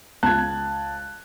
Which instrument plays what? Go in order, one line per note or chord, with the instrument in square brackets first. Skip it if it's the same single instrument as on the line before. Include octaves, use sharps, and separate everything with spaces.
[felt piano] C#2 G#6 [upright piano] A5 F#6